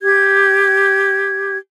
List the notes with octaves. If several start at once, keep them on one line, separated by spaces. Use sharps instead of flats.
G4 G#6